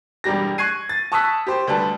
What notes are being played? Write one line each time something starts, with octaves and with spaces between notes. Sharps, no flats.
E1 G2 G3 G4 A#6
C#6 F#6 G#6 C7 D#7
A6
A5 C#6 D#6 E6 F#6 B6
G4 C5
D2 G3 B4 A5